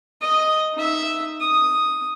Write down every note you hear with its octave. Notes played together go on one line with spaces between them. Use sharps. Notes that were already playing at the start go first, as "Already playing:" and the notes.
D#5
D#4 E5
D#6